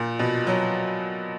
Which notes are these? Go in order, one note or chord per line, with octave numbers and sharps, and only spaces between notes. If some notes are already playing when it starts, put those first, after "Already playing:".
Already playing: A#2
B2
F#3